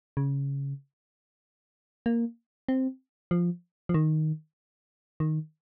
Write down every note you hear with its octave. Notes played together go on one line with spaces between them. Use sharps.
C#3
A#3
C4
F3
F3
D#3
D#3